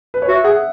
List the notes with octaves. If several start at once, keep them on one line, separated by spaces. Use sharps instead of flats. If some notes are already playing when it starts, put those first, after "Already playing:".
B4
C#5
F#4 E5
G#4 F#5